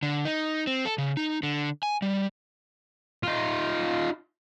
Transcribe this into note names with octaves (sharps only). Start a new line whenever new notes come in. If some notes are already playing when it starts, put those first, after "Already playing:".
D3
D#4
C4
A4
C#3
D#4
D3
G#5
G3
D#4 F4